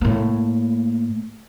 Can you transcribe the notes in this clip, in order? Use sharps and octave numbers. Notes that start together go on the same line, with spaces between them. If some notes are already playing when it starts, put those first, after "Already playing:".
A2 A#3